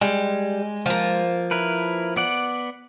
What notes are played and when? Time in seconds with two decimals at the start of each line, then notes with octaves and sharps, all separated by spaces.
0.01 G3 G#3
0.86 F3 A#3
1.51 E4 A#4 B4
2.16 B3 D5 F#5